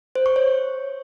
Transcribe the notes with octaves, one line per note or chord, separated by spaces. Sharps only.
C5
C#6
C#5